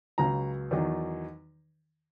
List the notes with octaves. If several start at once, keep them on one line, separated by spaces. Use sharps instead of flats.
C#2 C#3 F#3 A#5
E2 D#3 F#3